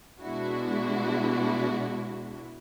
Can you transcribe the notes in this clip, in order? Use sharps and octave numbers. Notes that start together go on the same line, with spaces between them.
B2 G#3 D4 E4 F#4